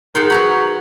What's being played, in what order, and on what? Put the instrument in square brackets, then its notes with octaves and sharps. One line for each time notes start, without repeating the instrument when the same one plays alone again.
[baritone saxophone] D#3 [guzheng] G#4 F#5 C6
[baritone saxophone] F#3 [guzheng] B4 A#5 B5